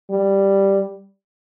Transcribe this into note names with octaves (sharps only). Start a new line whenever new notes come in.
G3